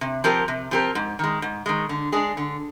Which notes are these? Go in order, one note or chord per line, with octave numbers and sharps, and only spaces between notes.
C3
F3 C4 G4 A#4
C3
F3 C4 G4 A#4
G#2
D#3 G#3
G#2
D#3 G#3
D3
G#3 D4 G#4
D3